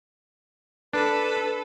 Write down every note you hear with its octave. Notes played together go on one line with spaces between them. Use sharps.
D4 A4 B4